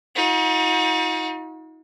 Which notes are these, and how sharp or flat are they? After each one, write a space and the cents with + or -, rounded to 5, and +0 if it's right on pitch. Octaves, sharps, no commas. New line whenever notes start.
D#4 +40 F#4 -45